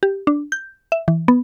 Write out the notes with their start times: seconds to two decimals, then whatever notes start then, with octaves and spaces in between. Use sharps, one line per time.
0.03 G4
0.27 D4
0.52 G6
0.92 E5
1.08 E3
1.28 B3